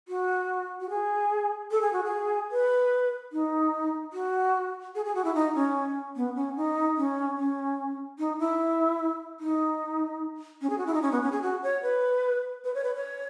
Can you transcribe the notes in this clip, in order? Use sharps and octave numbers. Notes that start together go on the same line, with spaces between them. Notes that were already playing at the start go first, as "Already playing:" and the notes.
F#4
F#4
G#4
A4
G#4
F#4
G#4
B4
D#4
F#4
G#4
G#4
F#4
E4
D#4
C#4
B3
C#4
D#4
C#4
C#4
D#4
E4
D#4
C#4
G#4
F#4
E4
D#4
C#4
B3
C#4
G#4
F#4
C#5
B4
B4
C#5
B4
C#5